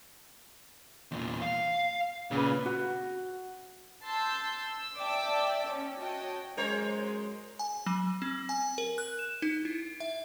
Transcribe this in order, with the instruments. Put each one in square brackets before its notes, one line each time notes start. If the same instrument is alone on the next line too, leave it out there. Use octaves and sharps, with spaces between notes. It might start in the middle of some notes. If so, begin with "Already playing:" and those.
[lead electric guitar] E2 A#2
F5
[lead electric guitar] A#2 [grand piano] C#3 B4
[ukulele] F#4
[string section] A5 C6 E6 G6
E6
D5 E5 G5 A5 D6 E6
C#4
F#4 C#5 D#5 G5 A5
[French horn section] F#2 G#3 [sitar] A#4 C5 C#5
[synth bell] G#5
F#3
C4
G#5
A#4
F#6
E7
D#4
E4
E5